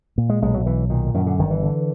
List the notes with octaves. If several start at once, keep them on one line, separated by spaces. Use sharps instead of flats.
A#2
G#3
B1 G#3
F#3
B1 E3
A#2 D#3
F#2 D#3
D3
G1 D#3
E3
D3